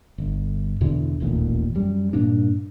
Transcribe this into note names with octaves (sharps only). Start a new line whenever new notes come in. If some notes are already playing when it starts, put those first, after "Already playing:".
G1
E2 B2 D3 E3
E1 A1 D#2 A#2
F#2 G3
G2 A#2 A#3 D4